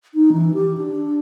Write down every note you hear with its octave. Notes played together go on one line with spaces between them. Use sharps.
D#4
E3
G4
D4